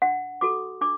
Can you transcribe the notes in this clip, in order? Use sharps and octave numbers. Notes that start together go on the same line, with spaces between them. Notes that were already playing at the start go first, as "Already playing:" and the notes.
D4 F#5
F#4 A4 D6
D4 D6